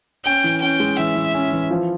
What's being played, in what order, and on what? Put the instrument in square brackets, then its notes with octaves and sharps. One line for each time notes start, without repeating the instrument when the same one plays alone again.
[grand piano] C#4 [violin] G5
[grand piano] E3
[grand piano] C#4 [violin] G5
[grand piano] G#3
[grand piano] E3 [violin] E5
[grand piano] E3
C#4
E3
F3